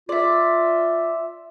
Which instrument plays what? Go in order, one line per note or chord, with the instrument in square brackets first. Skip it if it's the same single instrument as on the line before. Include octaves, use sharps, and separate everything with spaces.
[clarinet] F4 [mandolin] D5 E5